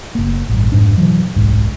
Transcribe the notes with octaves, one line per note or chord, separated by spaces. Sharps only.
F#1 A#3
A1 G2
F1 G#2 D4
B2 E3 F#3
D1 B1 G#2